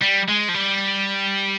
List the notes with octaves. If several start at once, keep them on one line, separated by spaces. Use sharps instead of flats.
G3
G#3
F3
G3